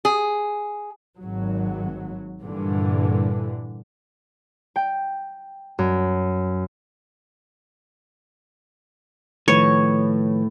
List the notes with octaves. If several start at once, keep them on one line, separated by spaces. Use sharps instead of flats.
G#4
G#1 F#3
G2 A#2 D3 E3
G5
F#2
A2 D#3 F3 B4 C#5